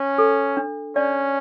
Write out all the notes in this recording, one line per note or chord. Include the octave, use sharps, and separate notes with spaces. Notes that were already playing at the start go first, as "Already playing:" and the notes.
Already playing: C#4
A4
D4
C#4 D5